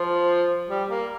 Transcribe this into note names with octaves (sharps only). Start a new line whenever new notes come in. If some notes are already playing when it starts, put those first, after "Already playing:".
Already playing: F3
G3
A#3